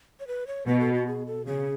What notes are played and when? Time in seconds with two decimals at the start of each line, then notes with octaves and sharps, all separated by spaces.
0.20 C#5
0.27 B4
0.47 C#5
0.67 B2 B4
0.80 A4
0.94 F#4
1.07 G#4
1.26 A4
1.46 C#3 G#4